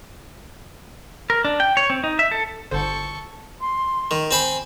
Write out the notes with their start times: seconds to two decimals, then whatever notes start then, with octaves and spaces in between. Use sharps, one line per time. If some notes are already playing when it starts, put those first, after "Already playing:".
1.30 A#4
1.45 D4
1.60 G5
1.77 C#5
1.90 C4
2.04 D#4
2.19 E5
2.31 A4
2.71 G1 D3 A4 C5 C#6
3.61 C6
4.11 D#3
4.31 C4 C5 G#5 B5